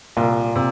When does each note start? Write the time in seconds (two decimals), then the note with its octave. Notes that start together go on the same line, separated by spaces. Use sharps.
0.17 C2 A#2
0.55 C3